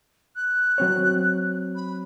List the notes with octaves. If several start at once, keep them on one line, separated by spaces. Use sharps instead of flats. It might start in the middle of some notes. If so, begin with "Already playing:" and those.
F#6
F#3 C4 C#5
B5